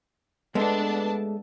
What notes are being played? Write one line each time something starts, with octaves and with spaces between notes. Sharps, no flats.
G#3 A3 B3 D4 A5